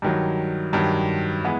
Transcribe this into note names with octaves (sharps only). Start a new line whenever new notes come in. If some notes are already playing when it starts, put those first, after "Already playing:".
G2 D#3 F#3
G2 D#3 F#3
E3 G#3 B3